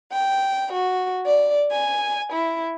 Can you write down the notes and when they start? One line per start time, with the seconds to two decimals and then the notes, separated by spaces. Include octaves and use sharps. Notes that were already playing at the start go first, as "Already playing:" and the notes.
0.12 G5
0.72 F#4
1.25 D5
1.72 G#5
2.32 E4